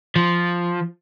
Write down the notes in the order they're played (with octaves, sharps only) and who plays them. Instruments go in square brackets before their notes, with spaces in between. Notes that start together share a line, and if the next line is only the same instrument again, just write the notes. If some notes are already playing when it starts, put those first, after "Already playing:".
[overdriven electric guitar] F3